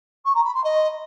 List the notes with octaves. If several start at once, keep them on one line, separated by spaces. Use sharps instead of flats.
C#6
A#5
B5
C6
D#5